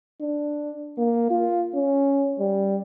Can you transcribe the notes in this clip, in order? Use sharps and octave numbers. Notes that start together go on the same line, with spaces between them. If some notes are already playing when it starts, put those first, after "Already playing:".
D4
A#3
F4
C#4
G3